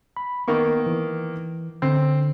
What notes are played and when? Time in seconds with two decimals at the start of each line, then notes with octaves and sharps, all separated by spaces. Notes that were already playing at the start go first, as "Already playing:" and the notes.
0.17 B5
0.48 D#3 A#3 B3 C#6
0.86 E3
1.82 D3 C4